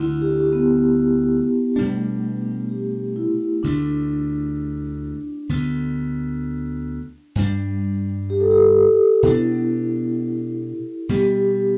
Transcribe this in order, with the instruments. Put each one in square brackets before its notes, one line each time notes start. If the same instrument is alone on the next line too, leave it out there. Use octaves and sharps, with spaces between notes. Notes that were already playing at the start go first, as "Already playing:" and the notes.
Already playing: [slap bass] D2 D3 A3 [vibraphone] E4
[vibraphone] G4
B3
[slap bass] B2 G3 D4 [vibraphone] A3
[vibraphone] G4
E4
[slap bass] D2 D3 A3 [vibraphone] D4
[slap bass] D2 D3 B3
G2 G3 D4
[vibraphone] G4
A4
G4
[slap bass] B2 B3 D4 [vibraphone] E4
[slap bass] B2 G3 B3 [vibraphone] G4